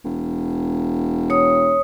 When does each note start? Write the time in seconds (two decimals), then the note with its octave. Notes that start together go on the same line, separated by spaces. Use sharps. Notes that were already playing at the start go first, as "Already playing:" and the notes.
0.04 E1
1.30 C#5 D#6